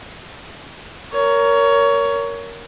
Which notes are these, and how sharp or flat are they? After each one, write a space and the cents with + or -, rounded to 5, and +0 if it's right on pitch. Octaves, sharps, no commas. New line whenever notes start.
A#4 +0 C#5 +20